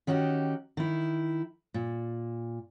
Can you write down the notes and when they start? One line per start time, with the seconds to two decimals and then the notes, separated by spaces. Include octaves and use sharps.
0.07 D#3 C#4 D#4 F#4 G4
0.77 D#3 E4
1.74 A#2